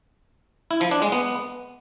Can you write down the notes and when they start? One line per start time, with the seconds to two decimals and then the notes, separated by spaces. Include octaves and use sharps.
0.71 E4
0.81 F3
0.91 D4
1.02 G#3
1.12 B3